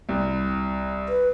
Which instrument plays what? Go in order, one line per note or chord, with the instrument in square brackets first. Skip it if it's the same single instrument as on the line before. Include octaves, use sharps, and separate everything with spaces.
[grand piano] C2
[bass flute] B4